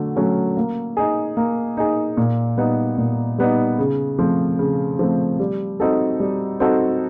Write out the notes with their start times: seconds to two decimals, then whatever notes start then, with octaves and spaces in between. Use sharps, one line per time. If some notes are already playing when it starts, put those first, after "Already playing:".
Already playing: D3 F#3 A3
0.16 F#3 A3 C#4 F#4
0.57 A#3
0.97 D#4 G#4
1.37 A#3
1.77 D#4 G#4
2.17 A#2
2.57 G3 B3 D#4
2.98 A#2
3.38 G3 B3 D#4
3.79 C#3
4.19 F3 A3 C4
4.59 C#3
4.99 F3 A3 C4
5.39 G3
5.80 C4 D#4 F#4 A4
6.20 G3
6.60 C4 D#4 F#4 A4